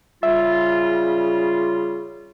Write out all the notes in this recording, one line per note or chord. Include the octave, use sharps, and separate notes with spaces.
C#3 G3 F4 E5